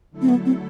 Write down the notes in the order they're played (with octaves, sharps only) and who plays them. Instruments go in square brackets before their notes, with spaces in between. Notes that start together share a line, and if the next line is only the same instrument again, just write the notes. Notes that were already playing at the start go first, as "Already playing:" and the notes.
[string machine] D3 F#3 A3 E4 A4
[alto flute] C4
B3
C4